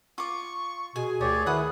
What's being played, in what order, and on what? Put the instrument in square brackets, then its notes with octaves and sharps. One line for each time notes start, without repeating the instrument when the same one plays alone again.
[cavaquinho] F4 D6 [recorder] C#6
[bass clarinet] B2 [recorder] G#4 [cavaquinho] G#5
[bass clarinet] D2 [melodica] G4 C#5 D5 [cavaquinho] A#4
[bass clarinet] D#3 [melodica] E4 B4 [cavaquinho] F#5 D#6